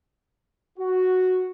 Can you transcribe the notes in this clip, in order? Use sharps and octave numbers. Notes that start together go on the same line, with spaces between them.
F#4